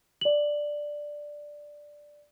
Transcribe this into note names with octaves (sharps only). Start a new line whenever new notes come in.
D5 F#7